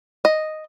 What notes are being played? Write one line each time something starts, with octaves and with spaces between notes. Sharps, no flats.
D#5